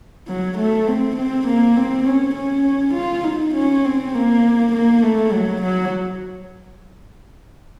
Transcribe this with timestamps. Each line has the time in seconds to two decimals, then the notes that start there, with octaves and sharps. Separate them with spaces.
0.28 F#3
0.58 A3
0.88 C4
1.17 C4
1.47 A#3
1.77 C4
2.06 C#4
2.35 C#4
2.95 F4
3.24 D#4
3.55 C#4
3.85 C4
4.14 A#3
4.73 A#3
5.03 A3
5.33 F#3
5.62 F#3